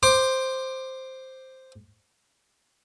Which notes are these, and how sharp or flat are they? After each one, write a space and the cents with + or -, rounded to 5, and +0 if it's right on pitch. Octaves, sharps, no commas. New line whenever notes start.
C5 +0 D6 +15